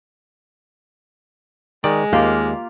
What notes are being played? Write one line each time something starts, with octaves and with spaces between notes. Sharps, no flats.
D#3 G#3 D5
D#2 A#3 F4 G4